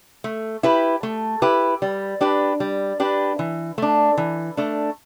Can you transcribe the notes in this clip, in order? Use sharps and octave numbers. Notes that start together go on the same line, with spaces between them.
A3
E4 G4 B4
A3
E4 G4 B4
G3
D4 G4 B4
G3
D4 G4 B4
E3
A3 D4
E3
A3 D4